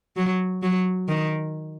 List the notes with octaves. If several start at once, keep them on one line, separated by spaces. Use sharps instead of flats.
F#3
F#3
D#3